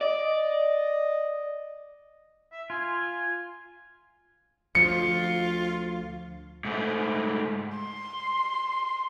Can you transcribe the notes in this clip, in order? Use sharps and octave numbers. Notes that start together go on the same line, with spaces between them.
D5 D#5
E5
F4 G#5
D2 F3 F4 C#7
G#2 A3
C6